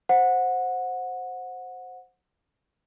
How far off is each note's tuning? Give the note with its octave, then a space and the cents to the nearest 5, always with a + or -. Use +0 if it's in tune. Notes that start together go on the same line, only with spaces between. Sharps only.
C5 +0 F#5 -15